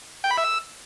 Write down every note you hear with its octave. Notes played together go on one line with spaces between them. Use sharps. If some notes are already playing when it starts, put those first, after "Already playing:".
G5
B5
E5
E6